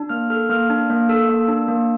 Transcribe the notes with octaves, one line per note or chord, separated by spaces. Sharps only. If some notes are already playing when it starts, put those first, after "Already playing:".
Already playing: D4
A#3 F6
A4 F6
A#3 F6
D4
A#3
A4 E6
A#3
D4
A#3